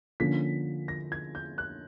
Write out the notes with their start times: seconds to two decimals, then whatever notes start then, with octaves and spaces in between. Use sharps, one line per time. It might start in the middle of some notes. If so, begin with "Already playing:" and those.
0.20 D3 F3 A#3 C#4 B6
0.88 A#6
1.12 G#6
1.35 G6
1.58 F#6